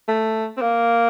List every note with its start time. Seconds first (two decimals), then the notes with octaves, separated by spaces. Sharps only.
0.09 A3
0.57 C4
0.62 A#3